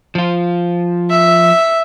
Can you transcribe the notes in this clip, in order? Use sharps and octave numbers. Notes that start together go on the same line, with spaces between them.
F3 F4
E5